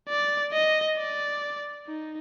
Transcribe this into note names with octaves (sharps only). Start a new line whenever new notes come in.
D5
D#5
D5
D#4